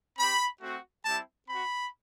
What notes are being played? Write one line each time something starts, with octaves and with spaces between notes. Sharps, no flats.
C4 G4 B5
A3 C4 F#4
G3 C4 E4 G4 A5
C4 F#4 B5